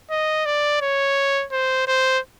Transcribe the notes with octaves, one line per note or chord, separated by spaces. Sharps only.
D#5
D5
C#5
C5
C5